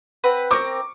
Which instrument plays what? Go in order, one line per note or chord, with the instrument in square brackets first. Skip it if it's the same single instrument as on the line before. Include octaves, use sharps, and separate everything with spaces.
[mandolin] C4 B4 F#5
[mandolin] C4 A#4 [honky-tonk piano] C#6 D6